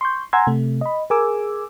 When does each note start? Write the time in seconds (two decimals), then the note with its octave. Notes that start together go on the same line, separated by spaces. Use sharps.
0.01 C6 C#6 G6
0.33 F#5 G#5 A#5 C6 E6 G#6
0.47 C3 A3
0.81 D#5 B5
1.10 G#4 A#4 G#5 D6 E6